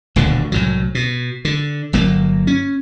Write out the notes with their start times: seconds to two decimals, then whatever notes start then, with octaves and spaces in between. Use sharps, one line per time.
0.16 D#1 D2 B2 D3
0.52 C2 A2 F#3
0.95 B2
1.45 D3
1.93 G1 F#3 A#3
2.47 C#4